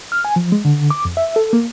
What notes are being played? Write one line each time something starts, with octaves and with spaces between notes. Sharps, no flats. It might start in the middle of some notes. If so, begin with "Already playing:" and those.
F6
G#5
F3
G#3
D3
D6
F2
E5
A4
A#3